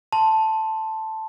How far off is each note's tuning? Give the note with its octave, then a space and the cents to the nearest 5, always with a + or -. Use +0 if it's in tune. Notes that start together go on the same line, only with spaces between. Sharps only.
A5 +0 C6 +0